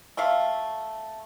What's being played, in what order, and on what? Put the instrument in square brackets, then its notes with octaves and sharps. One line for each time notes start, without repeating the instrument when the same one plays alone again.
[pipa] A3 F4 E5 F5